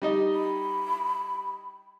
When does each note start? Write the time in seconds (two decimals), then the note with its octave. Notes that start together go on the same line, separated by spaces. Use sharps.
0.02 G3 D#4 D#5
0.33 B5